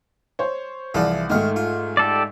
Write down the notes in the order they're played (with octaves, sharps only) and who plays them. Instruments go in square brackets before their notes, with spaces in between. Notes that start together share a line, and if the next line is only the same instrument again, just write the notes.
[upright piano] C5 C#5
[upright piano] C2 D5 [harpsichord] E3 F3 G#4
[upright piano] G#2 A3 [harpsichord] D#3 F5
[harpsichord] F4
[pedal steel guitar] G4 A4 D5